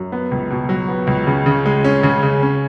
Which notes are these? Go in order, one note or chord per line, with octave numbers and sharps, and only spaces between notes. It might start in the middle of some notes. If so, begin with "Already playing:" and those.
Already playing: F#2
B3
C#2
B2
F#3
B3
C#2
C#3
C#3
G#3
C#4
C#3
C#3
C#4